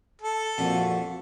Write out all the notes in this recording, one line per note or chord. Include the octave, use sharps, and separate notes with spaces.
A4
F2 A#2 G3 F4 F#4